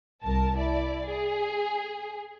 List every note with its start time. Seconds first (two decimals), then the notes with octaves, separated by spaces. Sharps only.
0.23 C2 A#4 A5
0.57 E4 D5
1.04 G#4